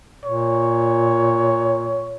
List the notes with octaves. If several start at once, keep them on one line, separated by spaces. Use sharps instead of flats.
A#2 C#5